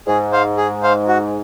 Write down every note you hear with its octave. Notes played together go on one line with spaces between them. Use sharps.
G#2 G#4
C5 F5
G#4
C5 F5
F#4